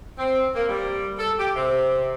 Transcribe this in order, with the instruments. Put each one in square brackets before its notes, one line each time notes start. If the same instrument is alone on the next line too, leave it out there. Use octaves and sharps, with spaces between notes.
[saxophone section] C4
A#3
G3
A4
G4
C3